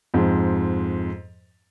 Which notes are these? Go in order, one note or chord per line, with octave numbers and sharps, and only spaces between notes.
F2 G#2